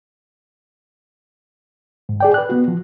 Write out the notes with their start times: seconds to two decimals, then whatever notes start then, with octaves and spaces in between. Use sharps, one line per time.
2.09 G#2
2.20 G#4 D5 G5
2.34 B4 F#6
2.49 B3 F#4
2.68 F3